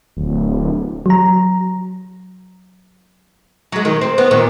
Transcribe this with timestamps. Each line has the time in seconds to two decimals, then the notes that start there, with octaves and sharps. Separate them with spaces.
0.17 D1
1.06 F#3 A#5
3.72 F#3 G#3
3.85 D#3
4.02 C4
4.18 B3
4.31 A#2 D#3